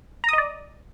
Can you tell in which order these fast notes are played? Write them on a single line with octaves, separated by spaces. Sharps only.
A#5 D#6 D#5 D5